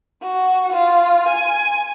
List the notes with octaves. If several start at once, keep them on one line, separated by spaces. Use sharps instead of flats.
F#4
F4
G#5